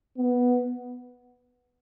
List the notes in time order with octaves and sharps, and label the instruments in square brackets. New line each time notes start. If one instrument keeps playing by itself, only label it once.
[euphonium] B3